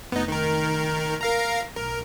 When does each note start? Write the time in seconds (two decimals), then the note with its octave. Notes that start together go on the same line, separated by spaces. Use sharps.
0.12 F1 B3 D#4
0.28 D#3 A#4
1.21 A#4 F5 A#5
1.77 B1 A#4